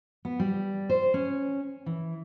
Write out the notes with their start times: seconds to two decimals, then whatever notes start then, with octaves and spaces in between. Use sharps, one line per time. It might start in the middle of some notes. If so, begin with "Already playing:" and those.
0.25 B3
0.40 G3
0.90 C5
1.14 C#4
1.86 E3